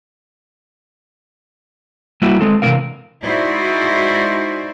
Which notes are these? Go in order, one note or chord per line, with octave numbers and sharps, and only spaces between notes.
G3 A#3 E4 F#4
G#3 C4 A4
C3 E3 A#3 D4 A#4 F5
G#3 D#4 E4 F#4 C5 D5